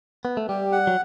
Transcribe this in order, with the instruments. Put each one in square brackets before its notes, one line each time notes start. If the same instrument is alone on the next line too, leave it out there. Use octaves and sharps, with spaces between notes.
[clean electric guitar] B3
A3
[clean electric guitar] G3 [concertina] G4
[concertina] F#5
[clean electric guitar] F#3